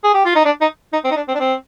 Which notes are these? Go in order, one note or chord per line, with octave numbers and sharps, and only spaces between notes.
G#4
G4
F4
D#4
D4
D#4
D#4
C4
D#4
D4
C4
D4
C4